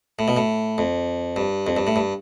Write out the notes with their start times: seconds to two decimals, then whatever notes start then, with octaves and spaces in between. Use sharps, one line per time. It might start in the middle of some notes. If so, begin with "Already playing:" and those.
0.19 A2
0.28 B2
0.37 A2
0.78 F2
1.36 G2
1.67 F2
1.77 G2
1.87 A2
1.96 G2